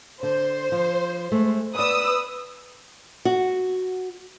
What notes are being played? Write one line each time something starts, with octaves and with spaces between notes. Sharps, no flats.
D3 C5
F3
G#3 A3
B3 B4 D5 D#6 E6
F#4